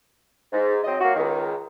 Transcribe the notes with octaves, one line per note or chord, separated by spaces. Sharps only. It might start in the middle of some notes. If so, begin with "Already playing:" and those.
G#2
F#3 C4 D#5
F#3 A#3 F#4
C#2 D#3